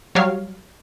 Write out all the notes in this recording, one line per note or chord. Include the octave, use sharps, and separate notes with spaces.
F#3 G3 C#5 F5